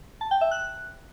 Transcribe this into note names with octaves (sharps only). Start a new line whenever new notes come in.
A5
G5
E5
F#6